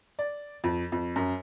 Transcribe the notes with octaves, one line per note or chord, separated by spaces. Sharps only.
D5
F2
F2
F#2